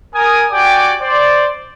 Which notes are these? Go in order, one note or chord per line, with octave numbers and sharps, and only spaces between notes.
A#4 G#5 D#6
F#4 G4 D5 G5 G#5 D6
C5 D5